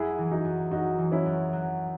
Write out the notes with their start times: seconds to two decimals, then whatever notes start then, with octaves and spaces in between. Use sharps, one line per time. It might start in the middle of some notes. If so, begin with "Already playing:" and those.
Already playing: F#2 E4 G#4
0.18 E3
0.31 D#4 F#4
0.45 F#2
0.71 F#2 D#4 F#4
0.98 E3
1.12 C#4 E4
1.26 F#2
1.53 F#3